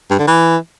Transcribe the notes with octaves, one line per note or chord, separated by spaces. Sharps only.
G2
D3
E3